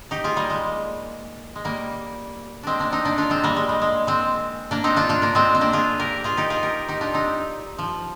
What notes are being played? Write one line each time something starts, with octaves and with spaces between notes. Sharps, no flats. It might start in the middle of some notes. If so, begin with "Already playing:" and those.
D#4 G4
F4 G#4
G3 A#3
G#3
G#3
G3 A#3
G#3 C4 D4
A#3 D4
C4 D#4
A#3 D4
D4 F4
G#3 C4
G3 A#3
G#3
G#3
G#3
G#3 C4
A#3 D4
C4 D#4
D4 F4
D4 F4
A#3 D4
G#3 C4
C4
A#3 D4
F4 G#4
G4 A#4
F4 G#4
D#4 G4
F4 G#4
G4 A#4
D#4 G4
D4 F4
C4 D#4
F3